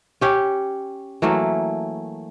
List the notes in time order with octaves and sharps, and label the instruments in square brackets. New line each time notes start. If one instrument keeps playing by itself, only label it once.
[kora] C#4 G4 C#5
E3 F#3 A3 A#3